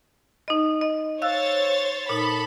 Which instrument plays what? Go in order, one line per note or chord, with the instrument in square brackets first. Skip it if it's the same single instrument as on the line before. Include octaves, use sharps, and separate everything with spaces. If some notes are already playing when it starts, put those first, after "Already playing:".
[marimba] D#4 D#5
D#5
[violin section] C5 C#5 A6 [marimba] F5 E6 F#6
[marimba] A#2 D#4 [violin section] A4 B5